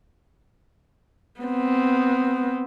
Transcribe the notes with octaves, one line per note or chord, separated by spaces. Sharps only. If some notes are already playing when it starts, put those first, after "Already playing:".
B3 C4